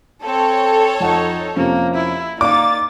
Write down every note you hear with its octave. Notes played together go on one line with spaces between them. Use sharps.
C4 A4 C#5
F2 D#4 F#5
F2 C3 A#3 C#4
E4
A#3 D#4 D5 F5 D6 A6